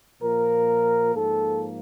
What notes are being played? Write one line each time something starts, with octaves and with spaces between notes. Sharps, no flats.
A#2 F3 A#3 A#4
G#2 F3 A#3 A4